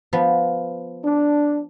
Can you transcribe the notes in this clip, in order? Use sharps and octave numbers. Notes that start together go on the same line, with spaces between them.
F3 B3 B4
D4